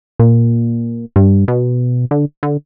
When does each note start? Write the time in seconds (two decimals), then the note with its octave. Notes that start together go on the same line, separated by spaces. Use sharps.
0.19 A#2
1.16 G2
1.48 B2
2.11 D3
2.43 D3